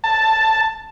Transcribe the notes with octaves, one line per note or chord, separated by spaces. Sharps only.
A5